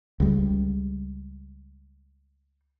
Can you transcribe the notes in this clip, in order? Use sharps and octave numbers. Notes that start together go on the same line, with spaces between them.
C#2 G3